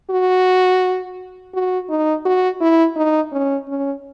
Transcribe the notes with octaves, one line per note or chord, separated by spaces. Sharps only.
F#4
F#4
D#4
F#4
E4
D#4
C#4
C#4